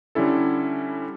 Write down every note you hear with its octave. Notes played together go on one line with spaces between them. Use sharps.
D3 G3 C#4 E4 A4